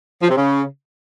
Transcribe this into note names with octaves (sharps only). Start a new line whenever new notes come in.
F3
C3
C#3